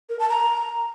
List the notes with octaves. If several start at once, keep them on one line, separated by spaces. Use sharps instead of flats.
A#4
A5
A#5